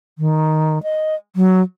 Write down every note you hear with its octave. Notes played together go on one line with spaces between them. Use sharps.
D#3
D#5
F#3